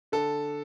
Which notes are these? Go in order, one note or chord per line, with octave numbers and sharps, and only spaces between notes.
D3 A4